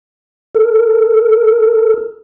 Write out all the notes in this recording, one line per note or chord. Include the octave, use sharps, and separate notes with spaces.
A4 A#4